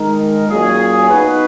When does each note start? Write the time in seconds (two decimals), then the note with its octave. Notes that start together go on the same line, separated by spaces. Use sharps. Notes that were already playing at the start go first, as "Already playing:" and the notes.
Already playing: D#3 G#3 D#4 A#4
0.48 A#2 F#3 C#4 G#4
1.10 B3 D#4 F#4 B4